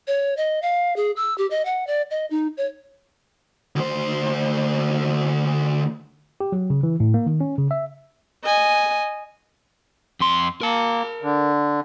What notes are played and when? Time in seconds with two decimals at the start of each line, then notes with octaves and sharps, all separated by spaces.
0.07 C#5
0.37 D#5
0.62 F5
0.96 G#4
1.16 E6
1.38 G4
1.50 D#5
1.65 F#5
1.87 D5
2.11 D#5
2.31 D#4
2.57 C#5
3.76 D2 C5
6.40 G4
6.52 F#3
6.70 C#3
6.83 E3
7.00 A2
7.14 A#3
7.26 D#3
7.41 C#4
7.58 C#3
7.71 E5
8.44 D#5 G#5
10.20 F2 C6
10.61 A#3 A#4 A5
11.22 D3